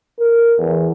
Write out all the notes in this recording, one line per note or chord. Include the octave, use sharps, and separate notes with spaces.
A#4
E2